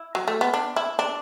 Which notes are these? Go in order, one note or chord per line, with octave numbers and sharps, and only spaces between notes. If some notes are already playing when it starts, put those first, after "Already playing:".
Already playing: E4
F#3
A3
B3
D4
E4
D4